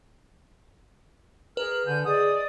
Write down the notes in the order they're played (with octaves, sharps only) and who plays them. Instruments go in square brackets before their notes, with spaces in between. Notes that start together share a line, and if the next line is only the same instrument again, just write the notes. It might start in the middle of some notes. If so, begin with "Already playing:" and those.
[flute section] G#4 A#4 F6 [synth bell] B4
[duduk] D3 [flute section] G#5 G6
[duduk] G#4 [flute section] D5 D#5 D#6